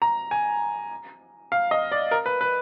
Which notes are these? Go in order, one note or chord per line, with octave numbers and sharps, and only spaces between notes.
A#5
G#5
F5
D#5
D5
A#4
B4
B4